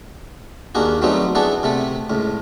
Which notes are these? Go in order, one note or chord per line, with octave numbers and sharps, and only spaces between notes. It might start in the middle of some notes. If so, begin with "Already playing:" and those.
D#2 A#3 D4 F#4 G#4
F#3 G3 A3 B3 C4 D#4
B3 D4 E4 F#4 G#4 A4
C3 A3 A4
C#2 A2